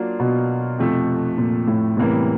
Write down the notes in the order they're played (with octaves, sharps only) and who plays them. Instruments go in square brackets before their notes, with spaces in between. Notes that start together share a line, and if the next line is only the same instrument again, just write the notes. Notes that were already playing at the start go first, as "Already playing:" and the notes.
Already playing: [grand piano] F#3 A#3 D4 F4
[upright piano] B2
[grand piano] F2 C3 F3 A3
[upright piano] A#2
A2
[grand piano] E2 C3 E3 G3 A#3 [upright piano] A2